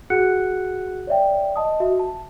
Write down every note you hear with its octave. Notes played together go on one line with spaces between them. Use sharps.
F#4 G#4 F#5 F#6 C#7
C#5 D5 E5 G5
D#5 A5 D#6
F#4 E5
A5